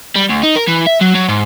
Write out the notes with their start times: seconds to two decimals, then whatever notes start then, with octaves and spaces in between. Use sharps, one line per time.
0.16 G3
0.29 D2
0.43 D#4
0.56 A#4
0.67 E3
0.86 E5
1.01 F#3
1.15 F#3
1.28 G#2